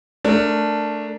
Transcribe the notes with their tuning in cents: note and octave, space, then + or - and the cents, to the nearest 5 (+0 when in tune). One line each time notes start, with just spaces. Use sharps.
A3 +0 D4 +0 A#4 -20